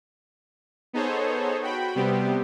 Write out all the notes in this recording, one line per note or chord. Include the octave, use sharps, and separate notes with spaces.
B3 D#4 G#4 A4 C5 C#5
F#4 G5 B5
C3 G3 B3 C4 G4